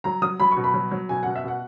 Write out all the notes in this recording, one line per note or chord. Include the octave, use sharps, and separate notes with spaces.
F#3 A#5
F#3 D#6
F#3 B5
C#6
B2
B5
F#3
F#3
B2 G#5
B2 F#5
E5
B2 F#5